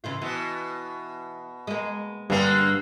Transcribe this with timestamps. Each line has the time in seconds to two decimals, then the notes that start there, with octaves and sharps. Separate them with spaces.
0.04 C#3 E3 F4
0.22 B2 E3
1.67 G#3 A#3
2.30 G2 D3 A#3 C4 G#4